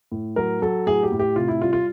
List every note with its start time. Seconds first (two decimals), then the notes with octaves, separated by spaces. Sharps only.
0.12 A2
0.36 F#3 A#4
0.62 F#3 A4
0.86 A2 G#4
1.03 G4
1.12 A2
1.19 G4
1.36 C3 F4
1.48 E4
1.61 G3 F4
1.73 F4